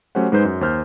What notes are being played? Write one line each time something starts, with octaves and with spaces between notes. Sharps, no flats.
F#3 A3 C#4 G4 C5 F#5
G#2 G#3 D#4 B4 C5 G6
F#2
D#2 C5 F6 G6